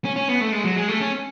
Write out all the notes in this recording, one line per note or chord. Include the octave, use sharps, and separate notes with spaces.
C#4
C#4
B3
A3
G#3
F#3
G#3
A3
C#4